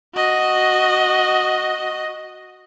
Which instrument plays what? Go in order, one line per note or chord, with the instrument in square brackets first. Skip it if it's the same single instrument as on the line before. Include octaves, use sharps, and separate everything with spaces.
[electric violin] F#4 D#5